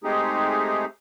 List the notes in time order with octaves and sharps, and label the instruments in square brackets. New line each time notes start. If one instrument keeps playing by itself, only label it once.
[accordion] G#3 A3 C4 D#4 G4 G#4